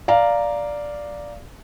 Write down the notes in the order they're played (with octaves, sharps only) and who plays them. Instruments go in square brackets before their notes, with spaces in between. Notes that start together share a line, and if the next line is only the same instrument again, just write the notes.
[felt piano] D5 F5 A#5